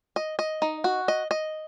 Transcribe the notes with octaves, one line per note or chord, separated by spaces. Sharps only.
D#5
D#5
D#4
F#4
D#5
D#5